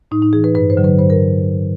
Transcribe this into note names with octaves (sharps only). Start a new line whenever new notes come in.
A2 D#4
D#4
E3 G#4
B4
G2 B4
C5
D3 F#3
B4
G2 C5
A#4